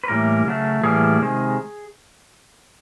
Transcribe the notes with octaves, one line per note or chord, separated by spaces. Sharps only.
B4
A2 E3 G3 A#3 A#4
C#3 F#3 A3
A2 E3 G3 A#3 G#4
C3 D#3 G#3